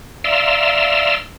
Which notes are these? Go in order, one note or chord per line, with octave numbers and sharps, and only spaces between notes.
D5 E5 F5 A#5 C6 E6